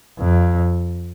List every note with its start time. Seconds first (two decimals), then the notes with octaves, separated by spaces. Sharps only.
0.19 F2